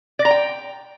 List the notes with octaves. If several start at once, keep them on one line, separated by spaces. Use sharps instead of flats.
D5
A#5
G5